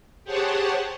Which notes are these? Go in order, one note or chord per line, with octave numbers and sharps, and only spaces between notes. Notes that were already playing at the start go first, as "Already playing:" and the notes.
G4 G#4 C5 C#5 F#5 A5